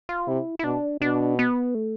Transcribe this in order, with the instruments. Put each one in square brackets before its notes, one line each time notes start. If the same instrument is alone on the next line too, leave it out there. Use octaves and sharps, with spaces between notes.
[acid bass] F4
[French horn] C3 [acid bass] E4
[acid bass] E4
[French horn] B2 [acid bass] D4
[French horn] B2 [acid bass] D4
[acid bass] B3
A3